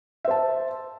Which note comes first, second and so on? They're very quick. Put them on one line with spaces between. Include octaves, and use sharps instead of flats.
E5 C5 A5